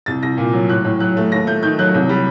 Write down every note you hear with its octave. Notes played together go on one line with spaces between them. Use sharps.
C2 A6
C2 A#6
A#2
F#3
A2 F#6
A2
F#3 F#6
A3
D#2 A#6
A3 G6
D#3 G6
F#3 F#6
C2
G3